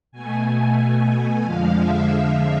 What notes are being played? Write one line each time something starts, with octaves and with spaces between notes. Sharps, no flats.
B2 A3 G#5
G#5
F2 D3 F3 G#3 F5
E5